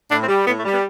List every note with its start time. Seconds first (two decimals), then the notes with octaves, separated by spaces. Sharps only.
0.10 A2 D4
0.22 C4
0.28 G3
0.46 A2 B3
0.59 A3
0.65 G3
0.71 B3